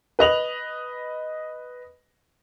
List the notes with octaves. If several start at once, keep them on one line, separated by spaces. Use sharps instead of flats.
B4 D#5 F7 F#7